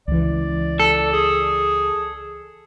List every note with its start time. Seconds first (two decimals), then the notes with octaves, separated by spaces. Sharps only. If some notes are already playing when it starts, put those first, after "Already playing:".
0.08 C#2 E3 D5
0.80 A4
1.13 G#4